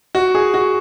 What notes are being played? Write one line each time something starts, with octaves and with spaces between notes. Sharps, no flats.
F#4
G#4
F#4